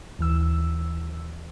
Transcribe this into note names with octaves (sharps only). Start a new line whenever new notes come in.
D#2 E3 E6